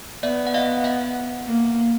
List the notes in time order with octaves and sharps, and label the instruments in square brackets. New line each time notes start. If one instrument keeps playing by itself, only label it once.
[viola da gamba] B3 [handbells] D5 E5
[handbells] F#5
D#5 F5
E5 F#5
[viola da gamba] A#3